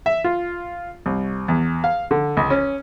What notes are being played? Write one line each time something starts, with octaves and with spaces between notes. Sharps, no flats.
E5
F4
C2
E2
F5
D3
C#2
C#4